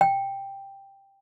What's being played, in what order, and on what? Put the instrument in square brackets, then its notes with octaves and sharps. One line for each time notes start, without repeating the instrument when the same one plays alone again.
[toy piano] G5